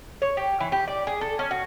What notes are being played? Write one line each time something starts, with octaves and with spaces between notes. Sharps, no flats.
C#5
G4
E3
G4
D5
G#4
A4
C#4
F#4